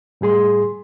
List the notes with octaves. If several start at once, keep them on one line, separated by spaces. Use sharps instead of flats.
A2 G3 G#4 C6